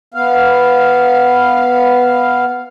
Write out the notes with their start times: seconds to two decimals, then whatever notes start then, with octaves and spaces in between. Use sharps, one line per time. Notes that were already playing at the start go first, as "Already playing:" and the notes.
0.14 B3 F5